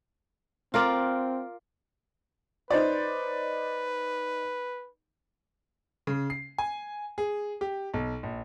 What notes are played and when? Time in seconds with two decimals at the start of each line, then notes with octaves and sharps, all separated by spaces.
0.74 C4 F4 A#4 D5
2.71 D#4 B4 C5 D5
6.07 C#3
6.30 C7
6.58 G#5
7.18 G#4
7.61 G4
7.94 B1
8.23 A#1